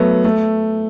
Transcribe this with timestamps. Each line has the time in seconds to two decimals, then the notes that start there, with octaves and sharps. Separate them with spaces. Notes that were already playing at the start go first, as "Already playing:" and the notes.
Already playing: F#3 A3 B3
0.24 A3